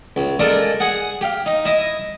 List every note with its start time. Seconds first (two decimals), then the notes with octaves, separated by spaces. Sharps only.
0.16 C#2
0.39 G#3 F4 A4 A#4 D5
0.80 G#4 F#5
1.21 G4 F5
1.46 D#4
1.65 E4 D#5